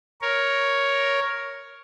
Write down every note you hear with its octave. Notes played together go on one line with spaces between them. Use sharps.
A#4 C#5